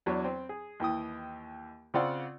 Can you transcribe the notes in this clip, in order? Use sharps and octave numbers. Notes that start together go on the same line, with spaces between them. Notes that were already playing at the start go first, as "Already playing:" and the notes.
E2 F#3 D4 C#5
C4
G#4
D#2 E3 G5 D#6
C#3 C4 F4 D5 F#5 E6